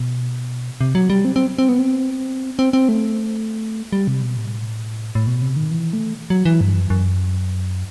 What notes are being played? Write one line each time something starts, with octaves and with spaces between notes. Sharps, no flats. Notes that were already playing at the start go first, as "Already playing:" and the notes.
Already playing: B2
C3
F#3
G3
C4
C4
C4
B3
C4
C4
C4
A3
G3
C3
B2
A2
A2
B2
C3
D#3
E3
A3
F#3
E3
G2
F#2
F#2